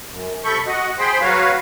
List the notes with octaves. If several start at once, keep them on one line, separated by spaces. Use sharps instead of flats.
F#2
C3 A4 B5 C#6 G6
F#4 D#5 F#5
G#4 C5 G5 B5 C6
F#3 F#4 B4 C#5 F5